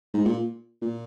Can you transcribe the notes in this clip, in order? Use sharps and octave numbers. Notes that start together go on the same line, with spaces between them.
G#2
A#2
A#2